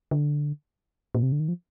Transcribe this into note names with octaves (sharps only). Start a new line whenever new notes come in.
D3
A#2
C3
D3
D#3
F3